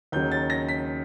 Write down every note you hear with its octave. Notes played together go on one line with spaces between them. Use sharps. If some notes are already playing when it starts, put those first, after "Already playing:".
D#2 C#3 F#3 G6
A6
A#6
B6